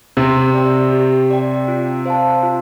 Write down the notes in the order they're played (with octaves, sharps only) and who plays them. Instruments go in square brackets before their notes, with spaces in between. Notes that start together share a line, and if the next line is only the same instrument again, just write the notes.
[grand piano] C3 C4 [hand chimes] G4
[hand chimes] D5 G5
G4
D5 G5
F4
C5 F5 A5
F4